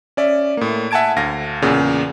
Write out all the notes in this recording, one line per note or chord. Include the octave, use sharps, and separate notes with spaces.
C#4 D5 E5
A2 A#3
E5 F#5 G#5 A5 G#6 D7
D2 F5 A#6
E2 A#2 C#3